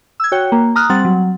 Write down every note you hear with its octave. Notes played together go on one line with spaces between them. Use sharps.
E6 G#6
F#4 C#5 G5
A#3
A#5 D#6 F6 F#6
G3 C4 F#5 A6
F#3